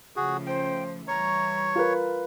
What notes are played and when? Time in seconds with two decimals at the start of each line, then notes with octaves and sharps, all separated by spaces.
0.16 C#3 F3 A3 F#4 G#4
0.47 C5 G5
1.08 E3 G3 C#5 A#5 C#6
1.76 F4 A#4 B4